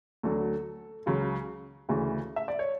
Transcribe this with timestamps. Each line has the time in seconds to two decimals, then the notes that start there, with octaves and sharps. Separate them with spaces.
0.23 D2 D3 F#3 A4
1.06 C#2 C#3 F#3
1.89 D2 C#3 E3
2.36 E5
2.48 D5
2.59 C#5